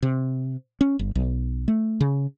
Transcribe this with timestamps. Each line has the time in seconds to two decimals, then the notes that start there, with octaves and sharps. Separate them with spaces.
0.02 C3
0.81 C#4
0.99 G1
1.15 B1
1.68 A3
2.01 C#3